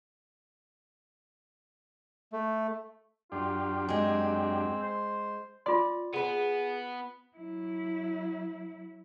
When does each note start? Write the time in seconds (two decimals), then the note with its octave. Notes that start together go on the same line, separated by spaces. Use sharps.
2.33 A3
3.32 F#2 D4 F4 G4
3.88 G#3 C4 G#4
4.82 C5
5.66 F4 D5 C6
6.13 B3 G#4 B4 G#5
7.36 F#3 E4